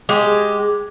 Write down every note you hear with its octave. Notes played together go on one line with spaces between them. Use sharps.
G#3 G4